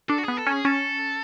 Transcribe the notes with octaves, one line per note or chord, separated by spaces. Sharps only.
D4 A4
F#4
B3 G#4
A4
C#4
G#4
C#4 A4